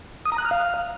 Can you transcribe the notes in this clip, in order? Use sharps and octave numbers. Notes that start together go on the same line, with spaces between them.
D#6
A#5
F#6
F6
F5